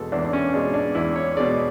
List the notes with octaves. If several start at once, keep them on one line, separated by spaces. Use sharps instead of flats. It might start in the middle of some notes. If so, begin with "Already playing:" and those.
Already playing: E2 B2 G#3 A4
E2 D4
D4
C#4
B2 G#3 D4
D4
E2 E4
C#5
B2 G#3 D5